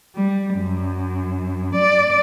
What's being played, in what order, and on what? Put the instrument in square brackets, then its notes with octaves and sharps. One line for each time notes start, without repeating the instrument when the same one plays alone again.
[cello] G3
F#2
D5